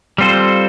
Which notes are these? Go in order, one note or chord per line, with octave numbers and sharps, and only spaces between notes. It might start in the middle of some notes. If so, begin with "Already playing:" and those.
G3 C4 F4 A4 C5